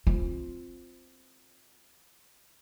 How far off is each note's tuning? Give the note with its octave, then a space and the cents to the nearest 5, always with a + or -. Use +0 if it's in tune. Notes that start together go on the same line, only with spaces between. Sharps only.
C4 +0 F4 +0